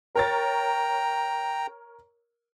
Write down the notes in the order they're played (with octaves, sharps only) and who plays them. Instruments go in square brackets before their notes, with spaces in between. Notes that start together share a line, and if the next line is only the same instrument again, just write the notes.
[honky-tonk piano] A#4 C#5 A6 [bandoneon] G5 A#5